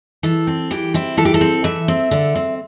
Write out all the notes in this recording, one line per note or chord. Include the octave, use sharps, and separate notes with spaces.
E3 A4
C4
E3 G4
C4 E4
E3 A4
G4
A4
C4
E3 E5
C4
D3
C4